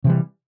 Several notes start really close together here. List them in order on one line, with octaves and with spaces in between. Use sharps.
C3 E3 G3